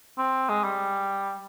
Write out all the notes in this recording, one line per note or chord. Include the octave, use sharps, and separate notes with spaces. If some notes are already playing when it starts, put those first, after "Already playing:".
C4
G#3
G3